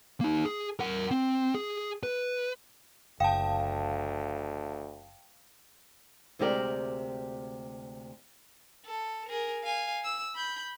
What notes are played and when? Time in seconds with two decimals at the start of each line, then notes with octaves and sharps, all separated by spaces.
0.21 A#3 D#4
0.45 G#4
0.79 A#4 F#5
1.11 C4
1.55 G#4
2.03 B4
3.20 F#1 D2 F5 G5 A5
6.39 D2 C3 G#3 G4 A#4 D5
8.86 A4
9.29 G#4 A#4
9.64 F5 G#5
10.04 E6
10.35 B5 G6